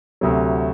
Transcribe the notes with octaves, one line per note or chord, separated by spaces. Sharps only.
D2 C3 F#3